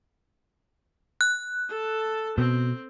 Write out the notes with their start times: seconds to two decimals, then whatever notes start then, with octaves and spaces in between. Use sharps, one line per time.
1.21 F#6
1.69 A4 A5
2.38 B2 C4